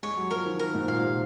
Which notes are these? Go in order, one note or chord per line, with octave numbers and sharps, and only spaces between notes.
G#3 C#5
F#3
F3 A#4
D#3
A#4
G#2
A#2 F5
C3